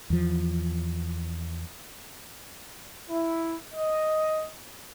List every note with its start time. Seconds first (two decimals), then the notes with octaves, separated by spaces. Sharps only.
0.10 E2 F3
3.08 E4
3.74 D#5